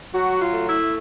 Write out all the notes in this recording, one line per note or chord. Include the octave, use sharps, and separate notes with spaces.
F#3 F#4
F4
A3
E4